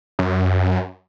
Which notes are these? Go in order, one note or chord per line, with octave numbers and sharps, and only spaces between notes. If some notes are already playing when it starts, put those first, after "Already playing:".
F#2